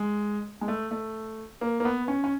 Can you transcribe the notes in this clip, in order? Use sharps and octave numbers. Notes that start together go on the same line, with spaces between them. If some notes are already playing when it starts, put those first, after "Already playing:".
Already playing: G#3
G#3
A3
A3
A#3
A#3
B3
C#4
C#4